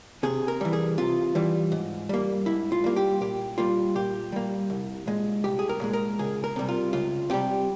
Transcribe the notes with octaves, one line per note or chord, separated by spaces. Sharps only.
C3 G#4
A#4
E3 G3
G#4
C3 F4
E3 G3
G#2
G3 A#3
G#2 E4
F4
G3 A#3
G4
A#2 G4
G3 A#3 F4
A#2 G4
G3 A#3
C2
A#2 G#3
C2 G4
G#4
A#4
A#2 G#3
A#4
C#2 G#4
A#4
C3 G3
F4
C#2 F4
C3 G3 G4